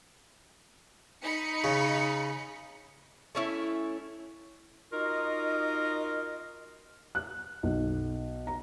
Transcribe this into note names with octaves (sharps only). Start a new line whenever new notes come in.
D#4 B5 C#7
C#3
A3 C#4 E4
D#4 F4 F#4 A#4 D#5
F#6
B1
A#5